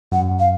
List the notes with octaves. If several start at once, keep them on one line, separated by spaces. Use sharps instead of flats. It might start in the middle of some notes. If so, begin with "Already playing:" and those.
F#2 F#5
F#2
F5